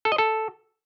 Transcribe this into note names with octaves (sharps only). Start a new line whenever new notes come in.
A4
D#5
A4